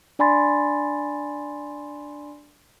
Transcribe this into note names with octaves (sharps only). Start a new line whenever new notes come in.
D4 D5 G#5 B5 C6 A6